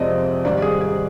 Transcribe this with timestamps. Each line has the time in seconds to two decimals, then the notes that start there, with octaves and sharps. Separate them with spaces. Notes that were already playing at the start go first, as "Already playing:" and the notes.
Already playing: F2 C3 F3 G#3 C4 D5 D#5
0.45 G#2 D#3 G3 D5
0.62 G#4
0.81 G#4